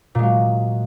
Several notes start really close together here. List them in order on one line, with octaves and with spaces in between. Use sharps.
A#2 G#3 F#3